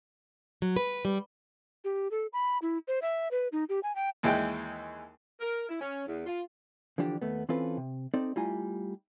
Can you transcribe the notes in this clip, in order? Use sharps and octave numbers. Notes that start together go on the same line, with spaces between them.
F#3
B4
G3
G4
A4
B5
E4
C5
E5
B4
D#4
G4
G#5
G5
D#2 E3 G#3 G5
A#4
E4
C#4
E2
F4
D3 E3 F3 D4 G4
D#2 A3 B3
E3 C4 C#4 F4 A4 B4
C3
C4 D#4 A4 D5
G3 A3 E4 F4 G#5 A#5